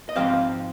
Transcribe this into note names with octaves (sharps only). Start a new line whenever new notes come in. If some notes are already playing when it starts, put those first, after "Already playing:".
D#5
G#2 F3 C4 F5